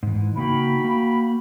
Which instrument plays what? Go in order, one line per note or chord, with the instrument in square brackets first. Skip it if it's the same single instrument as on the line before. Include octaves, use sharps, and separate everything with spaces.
[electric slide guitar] G#2 E3
[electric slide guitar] C#3 A#3 D#4 [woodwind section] F#4 G5 B5
[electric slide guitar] A#3